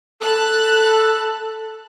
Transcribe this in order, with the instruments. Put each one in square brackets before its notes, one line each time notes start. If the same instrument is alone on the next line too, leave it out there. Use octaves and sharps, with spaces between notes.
[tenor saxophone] A4 [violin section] A5 B5 F#6